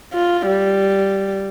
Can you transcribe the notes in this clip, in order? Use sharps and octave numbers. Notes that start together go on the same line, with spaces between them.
F4
G3